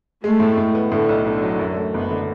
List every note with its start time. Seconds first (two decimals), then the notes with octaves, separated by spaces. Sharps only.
0.23 G#3 A3
0.40 A2
0.58 A2
0.75 B3
0.92 A2 D3
1.09 B1
1.25 B1 D3
1.42 F#3
1.59 F#2
1.76 A3
1.93 F#1 B3
2.11 D3